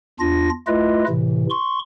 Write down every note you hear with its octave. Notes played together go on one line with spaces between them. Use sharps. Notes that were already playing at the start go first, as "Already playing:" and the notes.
E2 D4 F4 A#6
A3 E4 F4 B4 D#5
A2 C3 E3
C6 C#6